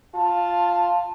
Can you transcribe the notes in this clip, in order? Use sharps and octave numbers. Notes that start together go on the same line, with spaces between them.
F4 A5